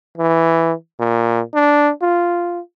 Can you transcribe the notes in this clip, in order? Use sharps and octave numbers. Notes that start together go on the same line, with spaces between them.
E3
A#2
D4
F4